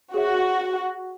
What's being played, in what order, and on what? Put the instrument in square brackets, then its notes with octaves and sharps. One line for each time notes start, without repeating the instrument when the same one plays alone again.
[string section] F#4 [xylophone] G#4 C#5 E5